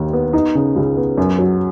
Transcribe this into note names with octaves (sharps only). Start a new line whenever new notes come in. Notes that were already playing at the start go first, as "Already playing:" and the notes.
Already playing: D#2 D#3 D#4
B3
D#4
C#3
C#2
B3
F#2
F#3